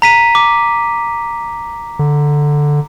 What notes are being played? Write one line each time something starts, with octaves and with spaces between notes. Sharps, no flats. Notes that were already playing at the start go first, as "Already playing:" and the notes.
A#5 B6 D#7
D6
D3